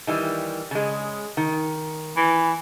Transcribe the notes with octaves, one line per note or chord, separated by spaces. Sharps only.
D#3 E3 G3
C#3 G#3
D#3
E3